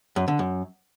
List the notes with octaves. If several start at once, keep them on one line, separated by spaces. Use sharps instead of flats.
F#2
D3
F#2